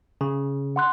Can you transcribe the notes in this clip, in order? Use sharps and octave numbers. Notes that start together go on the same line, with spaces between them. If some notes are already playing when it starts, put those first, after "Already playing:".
C#3
F#5 C6 F#6